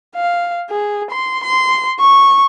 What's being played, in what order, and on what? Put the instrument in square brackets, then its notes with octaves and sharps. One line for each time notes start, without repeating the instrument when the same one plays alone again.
[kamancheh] F5
G#4
C6
C6
C#6